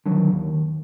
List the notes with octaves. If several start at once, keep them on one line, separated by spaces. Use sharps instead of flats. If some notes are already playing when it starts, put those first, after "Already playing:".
D3 D#3 F#3
D#2